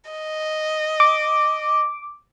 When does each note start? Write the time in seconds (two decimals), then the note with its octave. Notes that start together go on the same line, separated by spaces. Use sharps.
0.11 D#5
1.00 D6